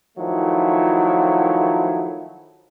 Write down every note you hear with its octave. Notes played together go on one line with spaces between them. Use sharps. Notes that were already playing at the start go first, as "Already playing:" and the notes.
D#3 F3 F#3 A3 E4